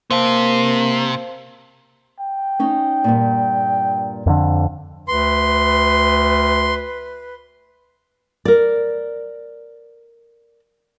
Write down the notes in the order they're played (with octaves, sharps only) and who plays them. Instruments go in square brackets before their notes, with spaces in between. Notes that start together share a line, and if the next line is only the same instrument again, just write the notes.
[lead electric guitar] C3 [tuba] A#3 [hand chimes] C5 F5 A5
[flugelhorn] G5
[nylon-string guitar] C#4 D#4
G2 A#2
[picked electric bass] F2 D3
[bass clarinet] D2 [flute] B4 [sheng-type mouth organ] C6
[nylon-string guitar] A#4 D5